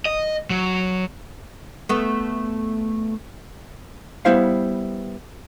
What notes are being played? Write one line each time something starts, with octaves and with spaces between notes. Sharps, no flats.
D#5
F#3
A3 B3
G3 B3 E4 C5 F5